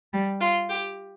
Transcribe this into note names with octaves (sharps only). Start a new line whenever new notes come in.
G3
F4
G4